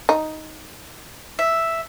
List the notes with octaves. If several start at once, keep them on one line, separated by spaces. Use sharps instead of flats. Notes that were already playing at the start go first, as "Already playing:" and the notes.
D#4
E5